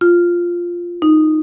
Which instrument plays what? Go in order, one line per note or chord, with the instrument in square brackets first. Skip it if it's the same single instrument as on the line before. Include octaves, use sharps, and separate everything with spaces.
[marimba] F4
D#4